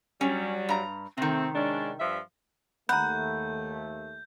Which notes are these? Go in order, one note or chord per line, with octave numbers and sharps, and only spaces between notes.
F#3 G3 C#4
G2 A#5
C3 D#3 A3 C4
G#3 C#4 D4
G2 F3 E5
D#2 A3 F#5 A#5 B5 G6